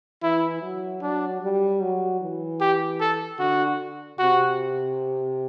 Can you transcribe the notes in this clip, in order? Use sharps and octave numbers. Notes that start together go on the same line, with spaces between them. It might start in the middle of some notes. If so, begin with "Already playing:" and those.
E3 E4
F#3
F#3 D4
G3
F#3
E3
G4
A4
D3 F#4
C3 F#4